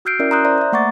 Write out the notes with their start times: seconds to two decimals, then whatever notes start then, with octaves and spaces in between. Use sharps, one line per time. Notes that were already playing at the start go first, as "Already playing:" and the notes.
0.05 F#4 E6 F6 G6 C7 D7
0.19 C#4 E4 A#4 D5 E5
0.31 A#5 C6 D#6 F#6 G6
0.45 C5 D5 E5 A#5 C6
0.58 E5 A#5
0.72 A3 A#3 F#5 C#6 D6 A6